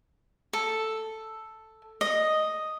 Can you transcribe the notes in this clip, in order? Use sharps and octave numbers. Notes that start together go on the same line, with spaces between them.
A4
D#5